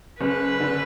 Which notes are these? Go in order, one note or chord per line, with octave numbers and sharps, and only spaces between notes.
F#1 B4
D3